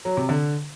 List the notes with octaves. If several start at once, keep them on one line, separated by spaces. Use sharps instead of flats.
F#3
C3
D3